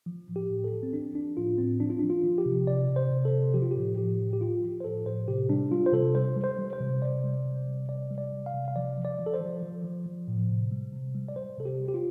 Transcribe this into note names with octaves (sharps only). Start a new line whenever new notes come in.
F3
A2
G4
A2
A4
F3
C4
F3 D4
F3 D4
A2 F4
A2 C4
F3 D4
F4
F3 D4
F4
F3
G4
C3
C3 D5
C3
C5
C3
A4
C3
F3 G4
F4
A2 G4
A2 G4
F3
G4
F3 F4
F3
C5
A2 A4
A2 C5
C3 G4
G3 D4
G3 F4
C5
C3 A4
G3 C5
G3
C5
G3
C5
C3
C3 D5
G3
C3
G3
C3 D5
G3
D5
C3
F5
C3
F5
F3 D5
F3
D5
F3
A4
C5
F3
F3
F3
F3
A2
C3
G3
C3
G3
D5
G3 C5
C3 A4
G4
G3
G4
F4